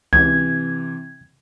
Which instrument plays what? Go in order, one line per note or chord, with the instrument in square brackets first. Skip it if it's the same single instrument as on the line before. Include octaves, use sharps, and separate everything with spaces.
[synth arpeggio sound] C#2 [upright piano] C3 E3 [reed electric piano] G#6